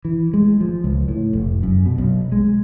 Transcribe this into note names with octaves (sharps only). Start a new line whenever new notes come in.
E3
G#3
F3
C#2
A2
F1
F#2
B2
B1
G#3